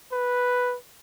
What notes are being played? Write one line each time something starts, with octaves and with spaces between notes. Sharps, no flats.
B4